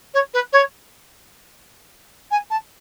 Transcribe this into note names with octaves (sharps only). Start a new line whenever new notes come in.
C#5
B4
C#5
G#5
A5